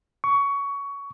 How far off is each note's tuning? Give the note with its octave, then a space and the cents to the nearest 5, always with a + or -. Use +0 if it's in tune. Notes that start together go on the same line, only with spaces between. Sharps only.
C#6 +20